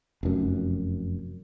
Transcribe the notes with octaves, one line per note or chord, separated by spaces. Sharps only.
F1 F#2